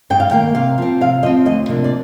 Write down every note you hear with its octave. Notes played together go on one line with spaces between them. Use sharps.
G2 G5
F5
D#3 A#3 G5
C3 F5
F3 C4
C3 F5
F3 C4 D#5
D2 D#5
C3 F3 A#3 D4
D5